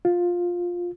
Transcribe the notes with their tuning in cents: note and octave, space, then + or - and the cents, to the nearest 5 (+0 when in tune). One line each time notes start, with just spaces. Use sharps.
F4 +10